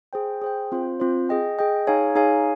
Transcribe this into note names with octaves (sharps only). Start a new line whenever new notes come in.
G#4 C5 G5
G#4 C5 G5
C4 F4 C5
C4 F4 C5
G#4 D#5 G5
G#4 D#5 G5
D#4 G#4 C#5 F5 G#5
D#4 G#4 C#5 F5 G#5